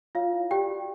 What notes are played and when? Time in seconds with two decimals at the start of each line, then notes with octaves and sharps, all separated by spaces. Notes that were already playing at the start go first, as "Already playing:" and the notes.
0.15 F4 C#5 F5
0.33 E4
0.51 G4 D5 G5
0.69 F#4